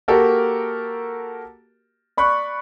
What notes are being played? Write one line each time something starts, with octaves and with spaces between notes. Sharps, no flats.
A#3 F#4 G4 A4 A#4
D5 B5 C#6 F#6